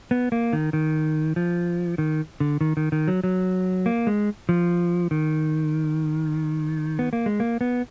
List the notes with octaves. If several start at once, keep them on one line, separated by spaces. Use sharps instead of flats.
B3
A#3
D#3
D#3
F3
D#3
D3
D#3
D#3
D#3
F#3
F#3
A#3
G#3
F3
D#3
B3
A#3
G#3
A#3
B3